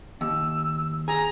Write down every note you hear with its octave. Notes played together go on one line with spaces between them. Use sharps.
D#2 E6
G#4 A#5